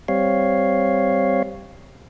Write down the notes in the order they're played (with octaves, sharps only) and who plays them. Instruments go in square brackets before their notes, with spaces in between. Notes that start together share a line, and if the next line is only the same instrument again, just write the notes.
[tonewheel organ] G3 C4 C#5 F5